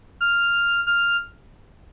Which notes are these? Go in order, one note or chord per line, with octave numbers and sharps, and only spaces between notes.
F6
F6